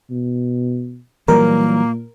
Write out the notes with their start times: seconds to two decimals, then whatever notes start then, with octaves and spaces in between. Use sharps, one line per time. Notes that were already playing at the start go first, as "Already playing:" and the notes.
0.11 B2
1.28 A#2 E3 F#3 G3 A#3 A#4